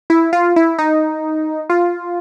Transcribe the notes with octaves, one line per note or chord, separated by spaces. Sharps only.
E4
F4
E4
D#4
F4